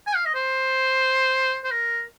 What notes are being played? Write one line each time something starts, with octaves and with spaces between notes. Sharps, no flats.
G#5
F5
D#5
C5
C5
A#4